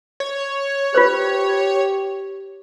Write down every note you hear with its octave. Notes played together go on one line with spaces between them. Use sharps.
C#5
F4 G4 B4 C5